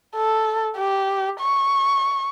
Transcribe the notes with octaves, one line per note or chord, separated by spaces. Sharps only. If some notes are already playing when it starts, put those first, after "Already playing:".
A4
G4
C#6